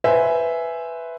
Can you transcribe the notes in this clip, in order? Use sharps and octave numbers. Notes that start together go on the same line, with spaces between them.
B4 C5 E5 G#5